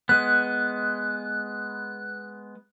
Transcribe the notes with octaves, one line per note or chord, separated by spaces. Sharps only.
G#3 B3 F#6